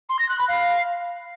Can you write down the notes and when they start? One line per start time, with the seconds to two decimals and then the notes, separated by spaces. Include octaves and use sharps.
0.09 C6
0.19 A#6
0.28 F#6
0.38 B5
0.48 F5